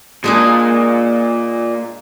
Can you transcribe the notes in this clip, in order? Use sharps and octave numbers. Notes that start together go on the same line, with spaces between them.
A#2 G#3 D4 G#4